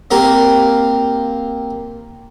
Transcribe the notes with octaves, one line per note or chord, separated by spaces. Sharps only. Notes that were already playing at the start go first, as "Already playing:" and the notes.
A#3 C4 F4 G4 A#4